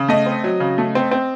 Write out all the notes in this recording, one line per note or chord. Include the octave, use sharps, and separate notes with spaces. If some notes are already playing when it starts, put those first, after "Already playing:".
Already playing: C#3
A3 D#5
C4
F#3
C#3
A3
C4
C4